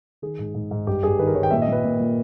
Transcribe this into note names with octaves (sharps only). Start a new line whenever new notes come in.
D#3 G#4
G#2
G#2
G#2
G2 G4
G2 G#4
D#3 B4
A#4
D#3 C#5
G5
A#2 E5
D#5
A#2
B4
A#2
A#2